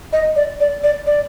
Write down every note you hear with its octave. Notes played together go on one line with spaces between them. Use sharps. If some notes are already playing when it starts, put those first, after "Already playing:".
D#5
D5
D5
D5
D5